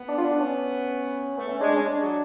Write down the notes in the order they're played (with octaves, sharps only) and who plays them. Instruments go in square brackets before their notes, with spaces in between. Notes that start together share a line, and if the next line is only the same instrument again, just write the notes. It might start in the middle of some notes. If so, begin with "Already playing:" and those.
Already playing: [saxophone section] B3
[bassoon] D4
F4
D4
C#4
[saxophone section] A3 [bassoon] B3
[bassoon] C#4
[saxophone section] G#3 [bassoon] D4
[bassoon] C#4
[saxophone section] G#3 [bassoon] D4
[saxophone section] F#3